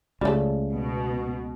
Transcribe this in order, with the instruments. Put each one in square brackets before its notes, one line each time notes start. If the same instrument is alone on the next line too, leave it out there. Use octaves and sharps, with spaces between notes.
[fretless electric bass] C#2 C#3 [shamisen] G3 A3
[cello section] B2